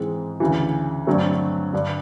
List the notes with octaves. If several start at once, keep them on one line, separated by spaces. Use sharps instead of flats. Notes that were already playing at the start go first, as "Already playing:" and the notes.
Already playing: G#2 E3 G#3 C4
D2 C#3 E3
G2 D3 F#3 A3 C4
G2 D3 G3